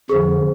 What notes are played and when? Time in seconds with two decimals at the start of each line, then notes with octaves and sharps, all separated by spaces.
0.09 F2 D3 F3 G#4